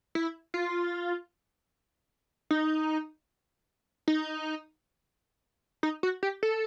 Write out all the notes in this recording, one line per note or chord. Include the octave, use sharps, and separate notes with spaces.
E4
F4
D#4
D#4
D#4
F#4
G4
A4